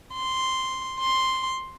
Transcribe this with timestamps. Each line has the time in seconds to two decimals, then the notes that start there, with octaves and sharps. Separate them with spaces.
0.13 C6
1.00 C6